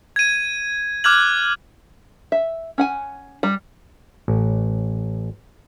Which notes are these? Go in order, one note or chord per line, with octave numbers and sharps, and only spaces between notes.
G#6 D#7
D6 F6 F#6 G#6 F#7
E5
C#4 F#5 G#5
G3
A1